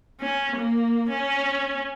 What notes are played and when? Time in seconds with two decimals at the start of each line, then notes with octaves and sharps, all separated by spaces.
0.21 C#4
0.57 A#3
1.10 C#4